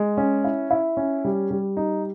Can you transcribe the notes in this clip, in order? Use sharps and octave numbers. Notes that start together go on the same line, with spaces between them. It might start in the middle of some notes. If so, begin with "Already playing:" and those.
Already playing: G#3
C#4
E4
E4
C#4
G3
G3
D#4